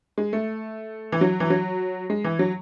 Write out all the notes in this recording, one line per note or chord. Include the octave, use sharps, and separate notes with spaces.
G#3
A3
E3
F#3
E3
F#3
G#3
E3
F#3